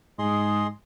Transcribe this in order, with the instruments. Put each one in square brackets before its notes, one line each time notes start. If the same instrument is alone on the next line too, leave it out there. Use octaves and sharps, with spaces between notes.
[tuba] G#2 [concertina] G#4 D#5 C6